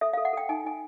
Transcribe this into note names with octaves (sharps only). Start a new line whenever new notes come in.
A4 E5
A4 F5
F#5
A4 G5
D#4 G#5
D#4 G#5